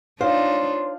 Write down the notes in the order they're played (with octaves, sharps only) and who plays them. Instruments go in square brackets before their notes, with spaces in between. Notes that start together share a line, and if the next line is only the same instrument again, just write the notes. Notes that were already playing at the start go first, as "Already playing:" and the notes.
[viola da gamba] D4 D#4 F4 [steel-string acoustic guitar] C5 [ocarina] C#5 [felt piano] F5